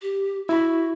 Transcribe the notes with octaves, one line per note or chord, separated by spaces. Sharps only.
G4
E4 F#4 B5